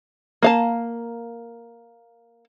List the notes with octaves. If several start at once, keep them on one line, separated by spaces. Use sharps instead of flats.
A#3 F5 A5